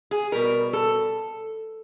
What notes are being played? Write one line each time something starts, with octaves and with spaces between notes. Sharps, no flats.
G#4
B2 G3 A#4
A4